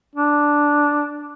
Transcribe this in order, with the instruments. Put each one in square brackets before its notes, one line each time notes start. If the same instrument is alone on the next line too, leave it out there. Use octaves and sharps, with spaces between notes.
[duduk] D4